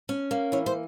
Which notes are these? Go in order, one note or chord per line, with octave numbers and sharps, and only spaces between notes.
C#4
A#3
E3 C#5
C5